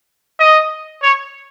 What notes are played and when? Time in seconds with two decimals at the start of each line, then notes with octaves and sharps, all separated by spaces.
0.39 D#5
1.02 C#5